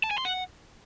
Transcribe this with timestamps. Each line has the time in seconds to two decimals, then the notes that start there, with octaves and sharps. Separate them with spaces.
0.04 A5
0.11 G#5
0.18 C6
0.25 F#5